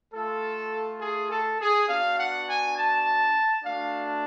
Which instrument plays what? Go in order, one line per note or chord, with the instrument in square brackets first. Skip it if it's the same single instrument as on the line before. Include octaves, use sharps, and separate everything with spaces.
[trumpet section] A3 F4 A4
G#4
A4
G#4
B3 D4 F#4 F5
F#5
G#5
A5
A3 D4 F#4 F5